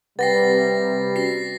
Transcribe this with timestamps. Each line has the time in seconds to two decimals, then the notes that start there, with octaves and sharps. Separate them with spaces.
0.19 C3 G3 B4 F#5 G5 A6 A#6 C7
1.16 C#4 F#4 A#6 C7